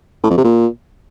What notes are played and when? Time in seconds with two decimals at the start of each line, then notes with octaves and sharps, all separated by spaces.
0.23 A2
0.30 F2
0.37 C3
0.44 A#2